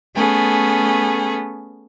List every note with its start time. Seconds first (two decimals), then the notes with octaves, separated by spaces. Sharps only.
0.15 A3 B3 C#4 G#4 A4